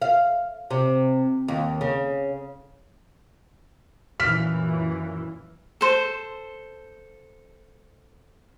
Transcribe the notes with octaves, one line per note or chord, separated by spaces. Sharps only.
F5
C3
D#2
C#3
F#2 A#2 E3 F6 B6
A4 C5